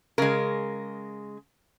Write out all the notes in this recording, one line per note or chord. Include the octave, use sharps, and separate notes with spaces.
C#3 G#3 A#4